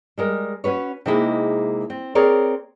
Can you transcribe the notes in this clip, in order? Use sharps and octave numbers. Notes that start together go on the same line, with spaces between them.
G3 G#3 A#4
C#4 F#4 B4 C#5
C3 G#3 A#3 D#4 E4 G#4
C4
C4 G#4 A#4 C#5 D5